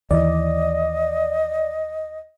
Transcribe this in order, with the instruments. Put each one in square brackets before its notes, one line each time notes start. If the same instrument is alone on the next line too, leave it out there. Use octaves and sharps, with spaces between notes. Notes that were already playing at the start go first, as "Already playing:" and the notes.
[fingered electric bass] D#2 E3 [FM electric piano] D5 [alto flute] D#5